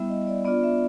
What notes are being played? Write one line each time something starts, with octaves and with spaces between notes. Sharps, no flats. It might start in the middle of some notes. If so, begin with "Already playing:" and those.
Already playing: G3 B3 E4 E5
D#5
D5
B3 D4 F4 D5
E5